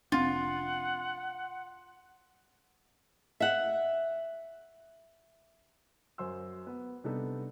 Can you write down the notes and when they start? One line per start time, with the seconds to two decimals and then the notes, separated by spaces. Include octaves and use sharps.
0.12 F1 C4 D4 F4 F#5
3.40 E5 F#5
6.18 F#2 C5 C6 E6
6.67 B3
7.04 C3 G3 B3 D4 D#4 A4